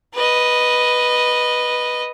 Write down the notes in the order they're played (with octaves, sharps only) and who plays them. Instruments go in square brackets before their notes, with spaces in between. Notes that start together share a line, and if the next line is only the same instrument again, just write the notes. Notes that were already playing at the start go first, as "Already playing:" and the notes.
[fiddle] B4 D#5